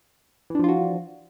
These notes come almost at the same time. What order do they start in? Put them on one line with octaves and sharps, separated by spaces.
E3 D4 F3 F4 F#4